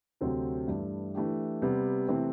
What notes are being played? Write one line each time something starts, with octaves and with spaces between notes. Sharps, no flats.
D2 C3 F#3 C4
G2 E3 A3 E4 G4
E3 A3 D4 G4
C3 G3 B3
C3 E3 A3 C4